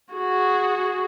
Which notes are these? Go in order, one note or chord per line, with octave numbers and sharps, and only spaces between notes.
F#4 G#4